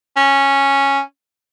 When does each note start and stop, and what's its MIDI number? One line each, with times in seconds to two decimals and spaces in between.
0.16 1.00 61